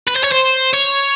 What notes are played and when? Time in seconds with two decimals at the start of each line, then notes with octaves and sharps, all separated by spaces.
0.07 B4
0.15 C5
0.24 C#5
0.31 C5
0.73 C#5